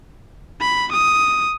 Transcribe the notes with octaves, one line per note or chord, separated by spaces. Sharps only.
B5
D#6